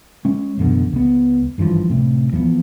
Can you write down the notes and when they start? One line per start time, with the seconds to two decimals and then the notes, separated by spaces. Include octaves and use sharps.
0.25 G#3 C#4
0.57 A1 F#2 B2 D3
0.92 C#2 B3
1.58 G#1 G2 E3 F3
1.90 A2 C3
2.32 E2 F3 F#3 B3